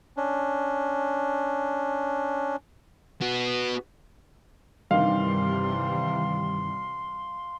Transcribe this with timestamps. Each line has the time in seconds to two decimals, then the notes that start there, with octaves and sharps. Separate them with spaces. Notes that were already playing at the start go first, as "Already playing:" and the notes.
0.17 C#4 D4
3.21 B3 F#4
4.91 G2 C3 D#3 E3 G3 F5 C6